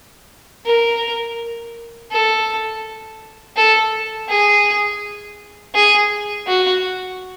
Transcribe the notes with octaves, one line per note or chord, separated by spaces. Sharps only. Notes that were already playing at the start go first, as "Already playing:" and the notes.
A#4
A4
A4
G#4
G#4
F#4